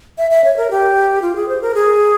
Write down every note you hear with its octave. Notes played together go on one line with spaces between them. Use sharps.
E5
E5
C#5
A#4
G4
F4
G#4
C5
A#4
G#4